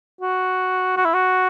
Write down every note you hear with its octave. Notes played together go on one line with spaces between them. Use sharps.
F#4
F#4
E4
F#4